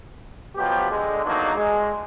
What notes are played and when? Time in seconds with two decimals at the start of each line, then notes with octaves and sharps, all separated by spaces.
0.56 B2 F3 F#3 G4
0.91 D3 G#3
1.24 E2 F#3 A#3 D4 D#4
1.55 G#3